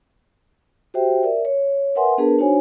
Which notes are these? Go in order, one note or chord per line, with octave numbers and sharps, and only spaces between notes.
F#4 G4 C5 E5 G5
A#4 D5 E5
C#5
A#4 B4 E5 F#5 G#5 C6
B3 D4 G#4 A#4 B4 A5
D4 D#4 F#4 C5 C#5 G#5